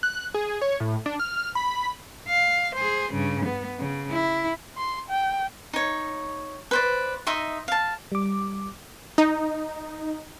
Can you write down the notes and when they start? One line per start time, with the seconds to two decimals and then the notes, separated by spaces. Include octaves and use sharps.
0.03 F#6
0.34 G#4
0.62 C#5
0.80 A2
1.06 D4
1.19 F6
1.55 B5
2.29 F5
2.75 G#4 C5
3.12 G2 C#3
3.46 B3
3.79 C#3
4.12 E4
4.77 C6
5.09 G5
5.73 D#4 C#5
6.71 B4 C5 D5
7.27 D#4 D#5 E5 C6
7.68 F5 A5
8.12 G3 D6
9.18 D#4